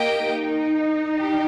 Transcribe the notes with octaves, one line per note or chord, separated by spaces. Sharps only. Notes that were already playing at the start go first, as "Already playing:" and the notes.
Already playing: A#3 G4 D#5 G5
D#4
G4